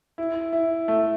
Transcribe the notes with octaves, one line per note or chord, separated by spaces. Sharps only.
E4
E4
A3